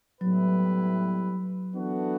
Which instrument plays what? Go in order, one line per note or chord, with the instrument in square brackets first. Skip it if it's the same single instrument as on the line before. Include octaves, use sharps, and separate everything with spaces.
[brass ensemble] A2 G3 B3 E4 B4 [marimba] F#3
[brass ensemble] E3 B3 D4 F#4 A4